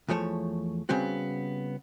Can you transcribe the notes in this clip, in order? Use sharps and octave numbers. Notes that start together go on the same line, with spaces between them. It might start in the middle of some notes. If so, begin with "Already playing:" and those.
E2 F3 A3 C#5 A5
C#3 G3 B3 C4 F#4